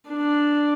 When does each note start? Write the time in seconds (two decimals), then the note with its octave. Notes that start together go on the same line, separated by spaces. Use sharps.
0.10 D4